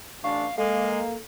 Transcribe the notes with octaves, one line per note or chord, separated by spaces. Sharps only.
A1 D4 F5 C#6
G#3 A#3 A4 F5